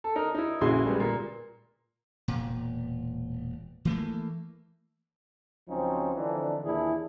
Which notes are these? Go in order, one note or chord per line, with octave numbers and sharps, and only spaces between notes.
A4
D#4 A#4
D#4 E4
A#1 C#3 E4 F#4 G#4 C6
G3 G#3 B3
A#2
E1 A#2
E3 A3 A#3
C#2 F3 F#3 C4 C#4 D#4
D3 E3 F3 C4 D4 D#4
D#2 A#2 E3 D4 E4 G#4